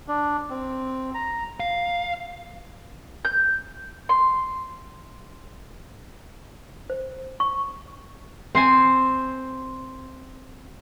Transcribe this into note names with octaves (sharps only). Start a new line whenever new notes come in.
D4
C4
A#5
F5
G6
C6
C5
C#6
C4 C5 G#5